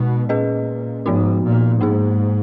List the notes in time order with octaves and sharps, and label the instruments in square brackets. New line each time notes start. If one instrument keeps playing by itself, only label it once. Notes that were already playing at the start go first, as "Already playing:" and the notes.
Already playing: [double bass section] B2 [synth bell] G#3 B3 D#4
[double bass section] A#2 [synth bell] C#4 G#4 B4 D#5
[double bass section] G#2 [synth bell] F3 B3 D#4 F#4
[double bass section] A#2
[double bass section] G#2 [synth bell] A#3 D#4 G#4